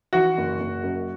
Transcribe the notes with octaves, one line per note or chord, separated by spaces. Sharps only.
E3 F#4
F#1
F#1
F#2